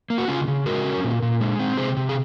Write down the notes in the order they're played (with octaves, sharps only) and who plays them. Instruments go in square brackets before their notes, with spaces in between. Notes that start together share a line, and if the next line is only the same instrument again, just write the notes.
[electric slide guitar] A#3
F#4
C#3 C#4 F4
C#3
G#3 F#4 A#4
C#4
A#2
A#2
G#3
C4
C3 G#4 C5
C3
G#4